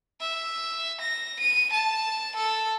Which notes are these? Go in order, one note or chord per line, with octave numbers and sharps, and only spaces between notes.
E5
A#6
D#7
A5
A4